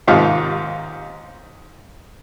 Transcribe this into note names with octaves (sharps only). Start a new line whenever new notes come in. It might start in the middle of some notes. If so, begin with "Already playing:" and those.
D#2 G#2 C3 F4 F5